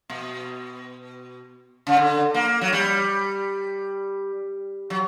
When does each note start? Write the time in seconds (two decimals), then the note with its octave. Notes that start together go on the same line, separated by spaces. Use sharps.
0.10 B2
1.87 C#3
1.97 D3
2.34 A#3
2.61 F#3
2.73 G3
4.90 F#3